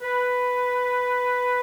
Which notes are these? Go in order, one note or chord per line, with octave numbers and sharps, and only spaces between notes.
B4